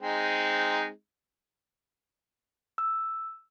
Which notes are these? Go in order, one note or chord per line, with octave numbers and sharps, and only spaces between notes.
G#3 C4 D#4
E6